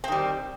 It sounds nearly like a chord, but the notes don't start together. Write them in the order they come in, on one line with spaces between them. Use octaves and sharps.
C4 D#3 G3